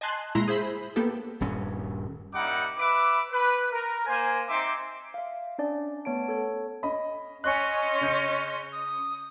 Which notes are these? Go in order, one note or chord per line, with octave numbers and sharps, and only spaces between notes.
D#5 G#5 A5 C6 F#6
A#2 G#3 E4 A#5 C6
G#4 C5 E5 B5
A#3 B3 G4 A4
D#1 G2 C#4
G3 A#3 D#4 E4 F#5 D6
B4 E5 B5 D6
B4
A#4
A#3 C5 G#5
C4 D#4 E5 C6 D6
E5 F5
C#4 D4 D5
A3 B3 C#5 A5 D7
A4 C#5
C#4 D#5 B5
C#4 D#5 G#5 C6 C#6 F#6
C#3 G6 C#7
D#6